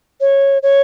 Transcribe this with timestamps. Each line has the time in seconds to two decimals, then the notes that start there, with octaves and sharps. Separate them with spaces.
0.21 C#5
0.63 C#5